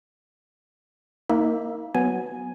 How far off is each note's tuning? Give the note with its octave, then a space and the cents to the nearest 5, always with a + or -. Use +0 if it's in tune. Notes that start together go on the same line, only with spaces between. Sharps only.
A#3 -5 D#4 +35 E5 +0
F#3 +0 B3 +0 G#5 +0